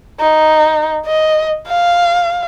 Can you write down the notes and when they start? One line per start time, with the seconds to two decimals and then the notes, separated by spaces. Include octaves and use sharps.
0.20 D#4
1.06 D#5
1.68 F5